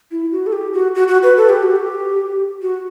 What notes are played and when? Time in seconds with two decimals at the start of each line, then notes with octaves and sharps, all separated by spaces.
0.11 E4
0.32 F#4
0.47 A4
0.53 G4
0.73 F#4
0.95 F#4
1.08 F#4
1.23 B4
1.37 A4
1.49 G4
1.63 F#4
1.76 G4
2.62 F#4